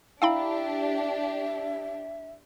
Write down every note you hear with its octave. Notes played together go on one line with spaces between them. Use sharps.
D4 E4 G4 E5 F5 G5 B5 E6